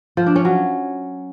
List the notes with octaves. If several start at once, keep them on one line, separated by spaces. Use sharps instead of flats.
F3
D4
C#4
F#3